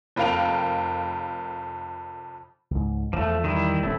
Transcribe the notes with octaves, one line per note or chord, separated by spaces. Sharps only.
F1 F2 A#4 F5 G5 F7
C#2 G#2
E2 F3 A3
D#3 G3 E4
D#1 A3 C4 E4